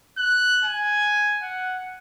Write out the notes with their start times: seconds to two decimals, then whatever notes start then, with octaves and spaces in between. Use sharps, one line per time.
0.18 F#6
0.64 G#5
1.42 F#5